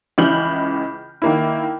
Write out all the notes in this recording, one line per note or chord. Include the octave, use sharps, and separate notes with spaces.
C#2 C#3 E3 F6 G6 F#7
D#3 A#3 E4